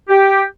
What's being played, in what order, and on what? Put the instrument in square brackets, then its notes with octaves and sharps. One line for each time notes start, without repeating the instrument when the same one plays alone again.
[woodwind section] G4